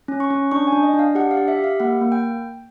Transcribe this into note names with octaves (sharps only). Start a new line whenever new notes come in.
C#4
C#6
C#4
D4 C#6
G#5
D4
D#5
D4
F5
G4 F#5
F5
G4
E5
G4
F5
A#3 F#5
A#3
G5